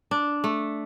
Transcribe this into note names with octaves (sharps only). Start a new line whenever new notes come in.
D4
A3